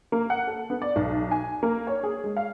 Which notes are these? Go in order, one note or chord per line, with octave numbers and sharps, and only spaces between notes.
A#3
F#5
A4
B3
D5
B1
G#5
A#3
C#5
G#4
G#3
F5